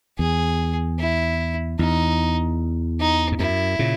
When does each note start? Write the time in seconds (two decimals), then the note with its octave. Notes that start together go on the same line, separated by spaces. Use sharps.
0.18 E2 G#4
0.99 E4
1.79 E2 D#4
3.00 D#4
3.32 G#2
3.40 F#2 E4
3.79 A#2 C#3